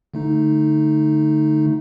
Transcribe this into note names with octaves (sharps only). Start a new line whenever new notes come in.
D3 A3 D#4